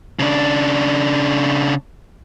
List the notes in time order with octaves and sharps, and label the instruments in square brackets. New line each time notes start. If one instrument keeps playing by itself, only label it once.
[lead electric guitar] C#3 D4